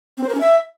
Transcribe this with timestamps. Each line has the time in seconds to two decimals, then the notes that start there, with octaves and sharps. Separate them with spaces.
0.18 C4
0.23 C5
0.29 A#4
0.35 C#4
0.40 E5